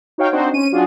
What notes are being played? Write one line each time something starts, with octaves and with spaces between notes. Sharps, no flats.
D#4 F#4 C#5 F5 G5
C4 D4 D#4 F#4 C5
C#4 D#7
F#3 D4 F4 F#4 G#4